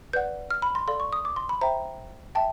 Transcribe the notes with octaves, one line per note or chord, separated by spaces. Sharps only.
B4 D5 F#5 G6
F6
B5
C6
A4 D5 F5 C6
C#6
D#6
D6
C6
B5
C5 E5 G5 A#5
E5 G5 A5